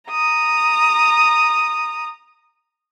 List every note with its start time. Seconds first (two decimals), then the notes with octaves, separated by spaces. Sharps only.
0.10 A#5 D#6